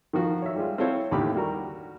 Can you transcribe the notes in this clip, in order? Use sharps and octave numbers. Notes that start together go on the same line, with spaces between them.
D#3 F3 F#4
C#5 E5
G3 G#3 F4
C4 E4 F4 A4 C5 C#5
D#2 A2 D3 G4 B5
G3 F#4 A#4